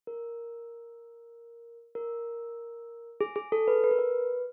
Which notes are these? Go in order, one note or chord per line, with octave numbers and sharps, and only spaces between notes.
A#4
A#4
G#4
G#4
A4
B4
B4
A#4
B4